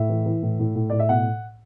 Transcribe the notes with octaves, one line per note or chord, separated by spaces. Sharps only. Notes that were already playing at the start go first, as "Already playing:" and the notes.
Already playing: A2 E5
E3
E3
A2
A2
A2
A2 D5
E5
B2 F#5